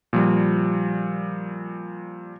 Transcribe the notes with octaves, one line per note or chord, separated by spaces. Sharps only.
A#2 F3 G3